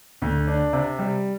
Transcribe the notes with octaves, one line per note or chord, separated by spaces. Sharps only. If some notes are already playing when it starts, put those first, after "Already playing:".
D2
D4
C3
G3